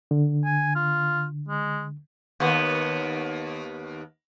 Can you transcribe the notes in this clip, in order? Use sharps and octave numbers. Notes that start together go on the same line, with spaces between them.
D3
G#5
F4
G#3
D#2 B3